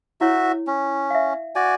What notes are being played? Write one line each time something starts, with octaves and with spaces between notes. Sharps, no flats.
E4 F#4 C#5 E5
C#4
E5 F5
F#4 D5 G#5